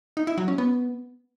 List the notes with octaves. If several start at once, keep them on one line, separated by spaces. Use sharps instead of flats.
D#4
E4
F#3
C#4
B3